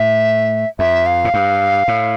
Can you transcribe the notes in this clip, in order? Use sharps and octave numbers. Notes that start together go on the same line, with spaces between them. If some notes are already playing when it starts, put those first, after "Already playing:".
Already playing: A2 E5
F2 E5
F5
A2
G2
A2